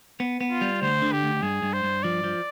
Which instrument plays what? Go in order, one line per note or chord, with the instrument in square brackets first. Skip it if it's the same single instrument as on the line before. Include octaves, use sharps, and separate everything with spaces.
[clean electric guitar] B3
B3
[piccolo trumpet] F4
[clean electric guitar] G3
[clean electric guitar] D2 [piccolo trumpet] C5
[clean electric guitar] D3
[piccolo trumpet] G4
[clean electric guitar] D2
[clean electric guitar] G2 [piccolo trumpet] G#4
[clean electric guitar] G2
[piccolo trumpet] C5
[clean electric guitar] G2
[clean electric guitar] F3 [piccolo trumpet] D5
[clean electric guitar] F3